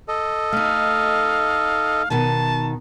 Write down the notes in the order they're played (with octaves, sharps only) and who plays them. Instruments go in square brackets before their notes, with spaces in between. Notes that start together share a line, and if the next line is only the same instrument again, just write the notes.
[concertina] A4 D#5
[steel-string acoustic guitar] A3 D#4 [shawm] F5
[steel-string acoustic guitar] B2 D#3 [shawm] A5